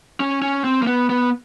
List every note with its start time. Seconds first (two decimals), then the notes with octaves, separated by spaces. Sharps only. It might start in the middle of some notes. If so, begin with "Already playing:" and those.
0.20 C#4
0.42 C#4
0.64 C4
0.82 A#3
0.87 B3
1.09 B3